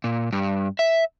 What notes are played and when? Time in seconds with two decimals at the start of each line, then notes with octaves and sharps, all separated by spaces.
0.04 A#2
0.33 G2
0.79 E5